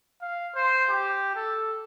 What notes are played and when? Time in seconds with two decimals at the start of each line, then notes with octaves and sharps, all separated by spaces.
0.22 F5
0.55 C5
0.90 G4
1.36 A4